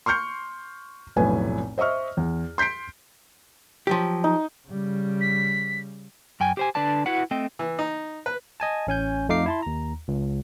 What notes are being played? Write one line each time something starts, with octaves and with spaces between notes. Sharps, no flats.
C6 C#6 F6 G6 C#7
F1 B1 A2 B4 G#5
C5 D#5 E5 C#6 F6
E2
C6 G6 B6 C7 D7
F3 F#3 G4
D#4
C#3 G3
B6
F#2 G5 G#5
G4 C5 G#5
D3 D4 B4 D5 A5
E4 F#4 B4 F#5
A3 C4 D#5 G5
E3
D#4
B4
D#5 G#5 A5
A1 C#4 G#5 G6
F2 A3 D#4 F5 D6 C7
E4 A5 C6
D#2 A#5
C#2